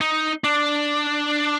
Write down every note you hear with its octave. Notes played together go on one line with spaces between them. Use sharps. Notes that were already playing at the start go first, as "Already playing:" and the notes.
D#4
D4